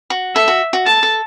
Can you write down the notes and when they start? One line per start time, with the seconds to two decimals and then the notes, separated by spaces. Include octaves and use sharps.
0.10 F#4
0.35 A4 E5
0.48 F#4
0.73 F#4
0.86 A4 A5
1.03 A4